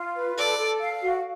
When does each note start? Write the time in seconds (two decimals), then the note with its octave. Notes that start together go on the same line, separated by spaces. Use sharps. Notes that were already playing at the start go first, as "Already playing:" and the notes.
Already playing: F4
0.15 B4
0.37 A4 D5
0.59 A4
0.80 F5
1.02 F#4